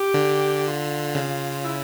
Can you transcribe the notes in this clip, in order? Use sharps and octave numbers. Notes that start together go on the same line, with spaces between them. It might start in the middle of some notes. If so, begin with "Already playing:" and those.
Already playing: G4
D3
F4
C#3
E4